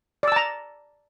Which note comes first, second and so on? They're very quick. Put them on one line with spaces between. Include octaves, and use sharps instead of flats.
D5 E6 A5 A#5